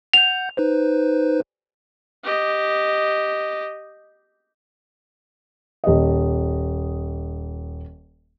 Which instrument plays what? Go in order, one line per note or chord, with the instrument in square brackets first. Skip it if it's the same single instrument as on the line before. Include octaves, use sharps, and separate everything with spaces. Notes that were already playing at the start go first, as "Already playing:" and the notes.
[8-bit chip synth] F#5 G6 [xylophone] F7
[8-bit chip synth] D#4 B4 C5
[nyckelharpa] G4 D#5
[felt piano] D#1 D#5